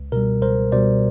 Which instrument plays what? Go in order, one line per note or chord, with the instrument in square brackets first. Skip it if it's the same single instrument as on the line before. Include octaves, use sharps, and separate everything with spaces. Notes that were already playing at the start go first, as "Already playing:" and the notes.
Already playing: [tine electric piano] C#2
B2 G3 A#4
C#2 A#4 C5
B2 G3 C5 D5